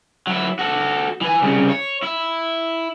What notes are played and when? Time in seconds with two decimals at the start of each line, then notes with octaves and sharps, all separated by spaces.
0.27 F#3 E4
0.59 F#4 A4
1.21 E3 G#5
1.42 C2 C#3
1.69 C#5
2.02 E4